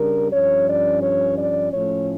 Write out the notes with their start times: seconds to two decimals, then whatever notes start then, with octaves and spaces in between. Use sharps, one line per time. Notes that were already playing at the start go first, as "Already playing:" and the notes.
Already playing: C#3 G3 D4 A#4
0.32 G2 F3 C#4 C#5
0.68 D5
1.03 C#5
1.38 D5
1.73 A2 F3 A3 C#4 C#5